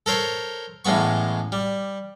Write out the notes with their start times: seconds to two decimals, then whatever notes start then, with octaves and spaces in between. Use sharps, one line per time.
0.06 A4 A#4 C5 C#5
0.85 A1 A2 G#3 B3 C#6
1.52 G3